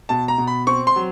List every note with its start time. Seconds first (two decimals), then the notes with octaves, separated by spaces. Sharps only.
0.09 B2 A5
0.28 A#5
0.38 B2
0.47 B5
0.67 C4 C#6
0.87 C6
0.96 F#3